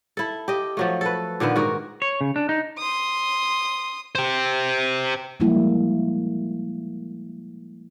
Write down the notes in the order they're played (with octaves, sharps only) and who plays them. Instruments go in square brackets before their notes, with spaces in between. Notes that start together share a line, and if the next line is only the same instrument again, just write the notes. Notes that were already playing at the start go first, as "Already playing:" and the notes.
[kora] E4 A4
G4 D#5
F3 F#3 A3
A4 B4
A#2 D3 D#3 B3
G#2 F#4 A#4
[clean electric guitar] C#5
C#3
D4
D#4
[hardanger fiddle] C6 D#6
[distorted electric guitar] G4 C5
[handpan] F3 G3 G#3 A#3 E4